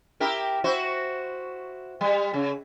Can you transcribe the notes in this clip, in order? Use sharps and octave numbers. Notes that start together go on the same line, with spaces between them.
E4 G4 A#4
E4 F#4 C5
G3
C#3